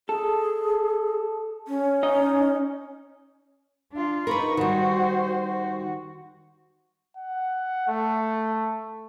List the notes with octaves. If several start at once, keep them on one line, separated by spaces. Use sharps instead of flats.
G#4 A4
C#4
D#4 D#5
D4 F4
D#4 A#4 B4 B5 C#6
D#3 G3 F#4 C5
F#4
F#5
A3